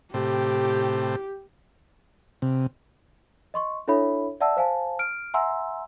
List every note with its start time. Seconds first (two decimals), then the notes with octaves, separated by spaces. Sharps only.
0.14 A2 C3 G4
2.42 C3
3.54 D#5 C6 C#6
3.88 D4 E4 A4 C#5 E5 B5
4.40 D5 E5 F#5 A5 E6
4.57 C5 F5 G#5 A5
4.99 F6 D7
5.34 E5 F#5 G#5 A#5 C6 E6